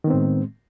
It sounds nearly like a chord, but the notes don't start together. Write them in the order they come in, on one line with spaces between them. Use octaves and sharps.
D#3 B3 C4 A2 G#3